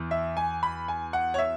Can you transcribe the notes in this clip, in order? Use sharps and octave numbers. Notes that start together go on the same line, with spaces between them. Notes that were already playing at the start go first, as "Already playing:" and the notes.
Already playing: E2 E3
E5
G#5
B5
G#5
F#5
C#5
E5